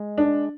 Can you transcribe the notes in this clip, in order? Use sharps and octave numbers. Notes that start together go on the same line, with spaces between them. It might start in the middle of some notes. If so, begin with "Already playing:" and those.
Already playing: G#3
D4